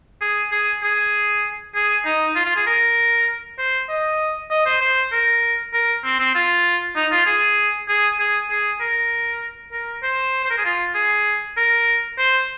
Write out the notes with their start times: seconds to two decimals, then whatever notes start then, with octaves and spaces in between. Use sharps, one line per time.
0.21 G#4
0.51 G#4
0.83 G#4
1.75 G#4
2.05 D#4
2.35 F4
2.46 F4
2.56 G#4
2.66 A#4
3.59 C5
3.89 D#5
4.51 D#5
4.66 C5
4.81 C5
5.12 A#4
5.74 A#4
6.04 C4
6.19 C4
6.35 F4
6.96 D#4
7.12 F4
7.26 G#4
7.88 G#4
8.19 G#4
8.50 G#4
8.80 A#4
9.73 A#4
10.03 C5
10.44 C5
10.50 A#4
10.58 G#4
10.65 F4
10.95 G#4
11.57 A#4
12.18 C5